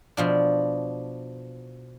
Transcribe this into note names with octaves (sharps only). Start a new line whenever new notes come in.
B2 F3 D4